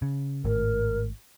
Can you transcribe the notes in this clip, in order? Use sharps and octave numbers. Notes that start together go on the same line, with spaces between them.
C#3
G#1 A2 A#4